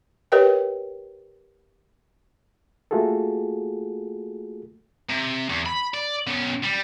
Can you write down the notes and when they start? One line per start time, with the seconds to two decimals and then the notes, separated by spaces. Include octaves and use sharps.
0.32 G4 A#4 B4 C#5 D#5 G5
2.91 A3 A#3 F4 F#4 G#4 A4
5.09 C3
5.49 E2
5.66 B5
5.94 D5
6.27 B2 C#4
6.63 G3